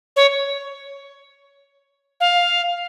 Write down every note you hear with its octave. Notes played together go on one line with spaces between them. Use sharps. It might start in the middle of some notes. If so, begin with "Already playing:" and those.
C#5
F5